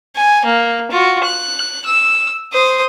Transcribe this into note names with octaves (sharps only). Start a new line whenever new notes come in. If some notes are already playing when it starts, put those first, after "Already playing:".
G#5
A#3
F4 F#4
F#6
E6
C5 D#6